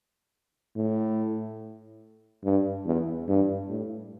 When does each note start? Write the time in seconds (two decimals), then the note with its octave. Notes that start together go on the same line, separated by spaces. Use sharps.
0.76 A2
2.44 G2
2.86 E2
3.28 G2
3.70 A2